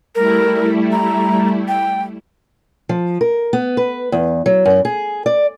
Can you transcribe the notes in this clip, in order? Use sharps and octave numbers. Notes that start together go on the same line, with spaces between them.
G3 A3 E4 A#4
A#5
G5
F3
A#4
B3
B4
E2
F#3
F#2
G#4
D5